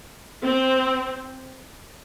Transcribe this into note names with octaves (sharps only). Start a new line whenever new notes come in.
C4